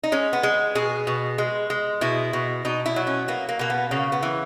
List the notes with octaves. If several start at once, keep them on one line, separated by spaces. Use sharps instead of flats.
D#4
G#3 C#4
B3
G#3
B2 G#4
B2
G#3
G#3
B2 E4
B2
B2 D#4
E4
F#3
C#4
A#3 B3
A#3
B2 A#3
B3
C#3 A#3
B3
E3